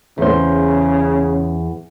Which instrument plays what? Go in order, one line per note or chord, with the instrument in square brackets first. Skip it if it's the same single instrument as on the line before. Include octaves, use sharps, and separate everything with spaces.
[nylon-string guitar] E2 C5 [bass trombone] C#3